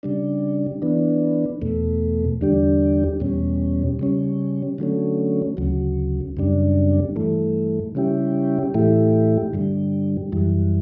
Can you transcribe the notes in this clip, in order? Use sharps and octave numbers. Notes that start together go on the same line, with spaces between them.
C#3 G3 D4
E3 B3 D4
E2 B2 A3
E2 D3 G3 D4 G4
E2 B2 G3 C#4
C#3 G3 C#4
D3 F#3 A3 C#4
D2 C#3 F#3
F#2 C#3 G3 D4
G2 E3 A3
C#3 G3 C#4 E4 G4
A2 E3 A3 E4 G4
G2 D3 G3
F#2 E3 G3